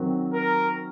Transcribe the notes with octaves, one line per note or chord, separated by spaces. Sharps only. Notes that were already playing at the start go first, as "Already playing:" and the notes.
Already playing: D#3 F#3 C4 F#4
A#4